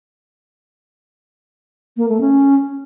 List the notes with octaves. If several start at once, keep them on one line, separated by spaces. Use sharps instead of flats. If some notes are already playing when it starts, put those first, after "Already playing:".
A#3
A3
C#4